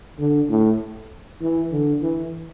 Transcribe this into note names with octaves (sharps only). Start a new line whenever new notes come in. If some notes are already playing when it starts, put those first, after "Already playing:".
D3
A2
E3
D3
E3